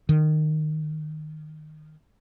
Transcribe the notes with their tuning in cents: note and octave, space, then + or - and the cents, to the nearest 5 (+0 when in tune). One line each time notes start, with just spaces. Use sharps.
D#3 -15